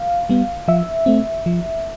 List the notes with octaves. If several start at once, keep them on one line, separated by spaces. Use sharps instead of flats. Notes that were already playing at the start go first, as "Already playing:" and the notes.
Already playing: F5
G3 B3
F3 E5
A3 C4
F3